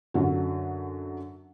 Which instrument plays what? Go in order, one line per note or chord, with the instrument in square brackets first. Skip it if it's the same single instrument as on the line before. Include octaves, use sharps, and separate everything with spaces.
[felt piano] F#2 D3 F#3